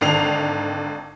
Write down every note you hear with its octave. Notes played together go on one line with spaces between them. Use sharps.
G#1 D3 D#3 C7 F7